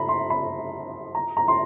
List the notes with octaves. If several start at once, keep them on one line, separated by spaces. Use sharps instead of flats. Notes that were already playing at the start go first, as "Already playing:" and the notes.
Already playing: A#5 B5
C6
B5
A#5
A#5
C6